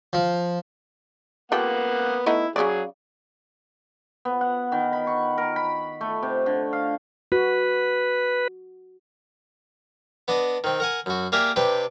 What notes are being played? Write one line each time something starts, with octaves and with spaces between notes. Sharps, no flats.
F3
A#3 B3 F4 G4 A4 F#5
A3 B3 D#4 E4
C#3 F#3 B3 G#4 D5
B3
F#5
D#3
B5
C#6
A#4
B5
A3
C3
D3
F5
F#4 B4
B3 D4 D#5
D#3 C4
A#4 F#5 G#5
F#2 F#4
A#3 G4 G#4 A#4 D5 E5
C3 D4 B4 G5